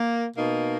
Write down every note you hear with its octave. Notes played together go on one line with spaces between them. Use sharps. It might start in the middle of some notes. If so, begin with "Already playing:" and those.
Already playing: A#3
B2 A#3 D#4